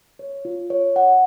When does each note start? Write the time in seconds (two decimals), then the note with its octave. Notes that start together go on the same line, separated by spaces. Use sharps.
0.19 C#5
0.45 F4
0.70 C#5
0.96 F#5